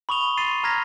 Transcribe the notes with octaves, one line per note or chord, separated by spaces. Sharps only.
B5 C#6 D#6 F7 G7
C6 A6 C7 D#7
A#5 F6 G#6 A#6 B6